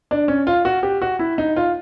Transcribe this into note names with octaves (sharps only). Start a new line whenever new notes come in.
D4
C#4
F4
F#4
G4
F#4
E4
D#4
F4